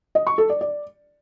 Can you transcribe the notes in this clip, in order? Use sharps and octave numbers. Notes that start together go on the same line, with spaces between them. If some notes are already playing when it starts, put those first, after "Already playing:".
D#5
C#6
A4
D5
D5